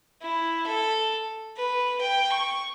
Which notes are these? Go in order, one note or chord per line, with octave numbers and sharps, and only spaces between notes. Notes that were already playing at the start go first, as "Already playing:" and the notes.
E4
A4
B4
G5
C#6